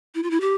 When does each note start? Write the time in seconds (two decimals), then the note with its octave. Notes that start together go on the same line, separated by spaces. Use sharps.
0.15 E4
0.23 F4
0.31 E4
0.41 G4